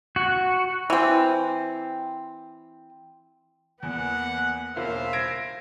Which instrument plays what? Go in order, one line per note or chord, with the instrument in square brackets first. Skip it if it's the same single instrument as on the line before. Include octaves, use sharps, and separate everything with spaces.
[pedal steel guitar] F#4
[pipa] E3 C4
[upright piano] E2 [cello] A#3 B3 [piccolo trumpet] F#5
[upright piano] E1 A#3 F4 [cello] C5 F5 [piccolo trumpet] E5
[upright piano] G#6 A#6 D7